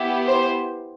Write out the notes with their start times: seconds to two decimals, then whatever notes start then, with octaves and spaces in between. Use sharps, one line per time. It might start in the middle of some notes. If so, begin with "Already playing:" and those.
Already playing: B3 E4 G4
0.27 C5